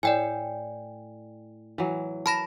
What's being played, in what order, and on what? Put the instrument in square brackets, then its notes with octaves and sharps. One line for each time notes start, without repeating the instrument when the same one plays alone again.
[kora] A2 [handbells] D5 G5 G#5
[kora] E3 F#3
[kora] A#4 [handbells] A5 B5 A#6